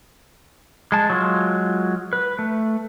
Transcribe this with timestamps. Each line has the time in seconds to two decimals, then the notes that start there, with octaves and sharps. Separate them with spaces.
0.92 G#3 A5
1.10 F#3 G#3 F4
2.13 B4
2.39 A3